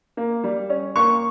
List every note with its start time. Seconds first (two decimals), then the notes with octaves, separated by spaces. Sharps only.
0.17 A#3
0.44 G3
0.70 C#4
0.96 A#3 C#6